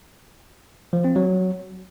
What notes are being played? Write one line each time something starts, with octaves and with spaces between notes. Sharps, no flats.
F3
C4
F#3